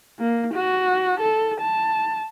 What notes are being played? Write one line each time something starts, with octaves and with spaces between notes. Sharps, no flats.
A#3
F#4
A4
A5